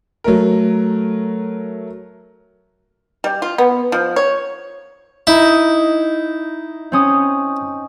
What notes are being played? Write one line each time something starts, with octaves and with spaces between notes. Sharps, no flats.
F#3 A3 A#4
G3
F4
B3
F3
C#5
D#4 E4
C4 C#4 D#6